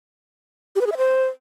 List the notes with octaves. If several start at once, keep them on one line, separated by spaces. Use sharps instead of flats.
G4
B4
G#4
E5
C5